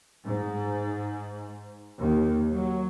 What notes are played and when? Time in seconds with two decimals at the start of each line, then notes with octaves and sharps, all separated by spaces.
0.24 G#2
1.98 D#2
2.52 F#3